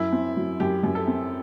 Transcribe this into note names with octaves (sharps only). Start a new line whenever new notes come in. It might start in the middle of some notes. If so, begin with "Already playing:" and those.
Already playing: F#2 E4
C4
F#3
F#2 G4
F#2
A4
C4